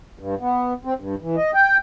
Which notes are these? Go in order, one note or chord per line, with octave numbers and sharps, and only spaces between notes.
G2
B3
C4
G2
E3
D#5
G5